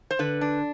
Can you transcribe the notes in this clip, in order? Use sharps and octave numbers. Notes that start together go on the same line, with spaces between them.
C5
D3 B4
D4